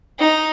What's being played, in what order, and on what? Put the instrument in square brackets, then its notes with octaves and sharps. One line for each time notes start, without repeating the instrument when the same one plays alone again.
[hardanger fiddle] D#4